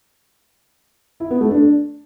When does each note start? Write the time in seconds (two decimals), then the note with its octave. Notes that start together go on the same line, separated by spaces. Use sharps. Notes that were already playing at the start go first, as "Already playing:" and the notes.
1.20 E4
1.30 B3
1.41 A3
1.51 D4